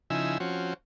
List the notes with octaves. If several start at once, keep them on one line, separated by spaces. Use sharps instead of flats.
C#3 F3 D#4 E4 G#5 E6
F3 C4 C#4 F#4